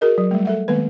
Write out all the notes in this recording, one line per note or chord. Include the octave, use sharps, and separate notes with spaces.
F#4 G#4 A#4 D#5
F#3
G3 A3
A4 E5 F#5
D#3 G#3 A#3 B3 B4